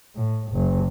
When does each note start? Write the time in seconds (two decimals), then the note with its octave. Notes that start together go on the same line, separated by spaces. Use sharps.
0.15 A2
0.52 F#1